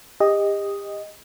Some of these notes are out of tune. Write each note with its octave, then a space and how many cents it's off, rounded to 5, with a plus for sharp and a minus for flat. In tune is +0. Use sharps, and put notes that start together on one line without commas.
G4 +35 D#5 +0